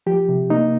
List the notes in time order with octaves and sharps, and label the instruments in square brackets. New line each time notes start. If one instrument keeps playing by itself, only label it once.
[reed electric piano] F3 G4
C3
A#3 D#4